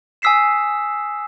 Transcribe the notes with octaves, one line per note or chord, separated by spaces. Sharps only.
G#5 D#6 E6 B6 C7 E7